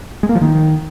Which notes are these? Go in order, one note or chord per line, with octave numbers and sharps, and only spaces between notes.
G#3
A#3
F3
D#3